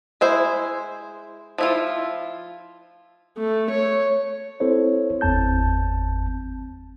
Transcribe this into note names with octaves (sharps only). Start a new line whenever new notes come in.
G#3 E4 C5
F3 E4 F4
A3
C#5
C4 E4 A4 C5 C#5
G1 E2 C4 A5 G6